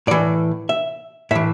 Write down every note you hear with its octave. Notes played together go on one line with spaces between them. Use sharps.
A2 E3 D5
E5
A2 E3 E5